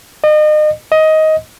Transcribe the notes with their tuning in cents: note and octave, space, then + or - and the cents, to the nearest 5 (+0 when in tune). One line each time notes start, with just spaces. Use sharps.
D#5 -35
D#5 +15